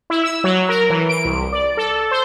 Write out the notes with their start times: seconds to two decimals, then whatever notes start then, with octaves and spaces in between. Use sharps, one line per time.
0.10 E4
0.23 E6
0.44 F#3
0.69 A#4
0.90 E3
1.09 D7
1.25 C2
1.52 D5
1.77 A4
2.11 C5